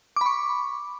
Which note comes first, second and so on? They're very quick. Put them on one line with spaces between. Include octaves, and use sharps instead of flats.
D6 B5 C#6